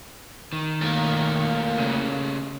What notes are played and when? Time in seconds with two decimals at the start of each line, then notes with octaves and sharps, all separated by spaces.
0.53 D#3
0.82 A2 A#3
1.79 C#3 A3 C#4